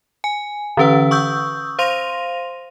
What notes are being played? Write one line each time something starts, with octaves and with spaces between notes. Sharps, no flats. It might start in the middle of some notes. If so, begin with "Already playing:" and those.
G#5
D3 E3 C#4 B4 F#5
C#6 D#6 E6 G6
C5 F5 C6 A#6 D#7 F7